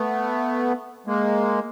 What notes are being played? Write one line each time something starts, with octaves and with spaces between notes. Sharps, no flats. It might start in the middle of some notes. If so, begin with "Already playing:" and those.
Already playing: A3 B3
G#3 A#3